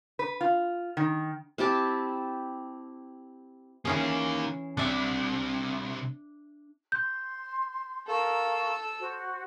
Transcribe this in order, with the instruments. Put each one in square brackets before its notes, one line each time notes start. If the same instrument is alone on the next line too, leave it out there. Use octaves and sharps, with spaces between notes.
[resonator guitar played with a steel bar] B4
F4
D#3
[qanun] C4 E4 G4 A5
[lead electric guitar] D#3 A#3 [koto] E3 C#4 G#4
[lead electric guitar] C2 C3 [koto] D4 E5
[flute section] C6 [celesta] G6
[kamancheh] A4 E6 [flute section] A#4 F5 C#6
[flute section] F#4 C5